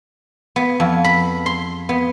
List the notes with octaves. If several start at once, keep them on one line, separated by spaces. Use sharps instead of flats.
B3
F2
B5
C6
B3